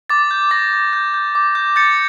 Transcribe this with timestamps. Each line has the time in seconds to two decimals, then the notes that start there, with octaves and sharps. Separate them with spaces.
0.10 D6 A6
0.31 G6
0.51 D6 A#6
0.73 D6
0.93 G6
1.14 G6
1.35 D6
1.55 G6
1.76 G6 A6 C#7